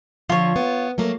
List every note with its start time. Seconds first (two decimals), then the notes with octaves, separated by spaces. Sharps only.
0.29 D3 F3 F4 C#5
0.56 B3
0.98 F#3 A3 A#3